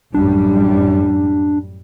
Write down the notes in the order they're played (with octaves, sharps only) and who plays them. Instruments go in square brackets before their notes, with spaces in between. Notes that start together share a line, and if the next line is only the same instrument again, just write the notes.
[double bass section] A1 F#2 G3 [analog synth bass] D4